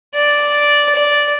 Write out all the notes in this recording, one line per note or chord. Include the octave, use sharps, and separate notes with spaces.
D5
D5